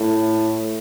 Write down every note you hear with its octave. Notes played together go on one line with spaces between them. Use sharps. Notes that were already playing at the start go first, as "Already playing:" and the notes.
Already playing: A2